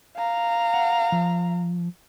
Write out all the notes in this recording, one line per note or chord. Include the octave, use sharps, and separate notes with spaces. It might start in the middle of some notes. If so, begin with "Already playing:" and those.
F5 A#5
F#5
F3